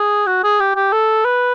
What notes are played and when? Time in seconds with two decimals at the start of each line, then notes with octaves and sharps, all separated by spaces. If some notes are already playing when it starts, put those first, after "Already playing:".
Already playing: G#4
0.27 F#4
0.44 G#4
0.60 G4
0.76 G4
0.92 A4
1.25 B4